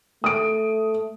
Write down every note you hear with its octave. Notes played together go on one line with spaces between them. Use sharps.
A3 D#6 D7